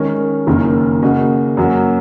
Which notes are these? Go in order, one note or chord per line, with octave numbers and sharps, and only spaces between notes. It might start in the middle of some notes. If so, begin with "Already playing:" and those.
Already playing: D#3 G#3 C#4 A#4
F#1 F#2 D#3 A#3
C#3 A#3 F#4 D#5
F#2 F#3 A#3